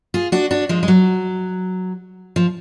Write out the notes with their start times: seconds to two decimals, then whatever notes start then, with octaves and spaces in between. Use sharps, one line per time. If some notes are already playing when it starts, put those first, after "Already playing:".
0.14 F4 G#4
0.32 D4 F#4
0.51 D4 F#4
0.69 F3 G#3
0.83 G#3
0.88 F#3
2.36 F3